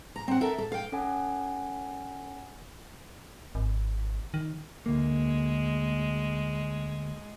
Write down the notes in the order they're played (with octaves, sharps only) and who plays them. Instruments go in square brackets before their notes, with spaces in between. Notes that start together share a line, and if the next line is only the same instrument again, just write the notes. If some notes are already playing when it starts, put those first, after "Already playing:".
[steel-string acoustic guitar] A#5
C4 F#5
A4 A#4 E5
A4
F5 G5
[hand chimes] C#4 A4 F#5 G#5
[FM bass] G#1
D#3
[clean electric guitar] D2 A#3 [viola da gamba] G#3